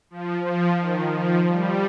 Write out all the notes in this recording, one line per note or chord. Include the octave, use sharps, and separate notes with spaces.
F3
F3
D#3
F3
G3